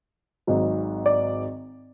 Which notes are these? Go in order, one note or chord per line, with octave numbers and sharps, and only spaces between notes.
G#1 G#2 F#3
D5